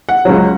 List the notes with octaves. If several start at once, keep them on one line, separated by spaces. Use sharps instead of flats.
F#5
C#2 C#3 F#3